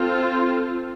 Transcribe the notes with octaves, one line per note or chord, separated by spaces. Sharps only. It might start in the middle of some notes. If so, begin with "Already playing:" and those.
Already playing: C4 F4 A4